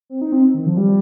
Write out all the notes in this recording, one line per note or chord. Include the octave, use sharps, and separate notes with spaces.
C4
D#4
C4
D#3
F3
G3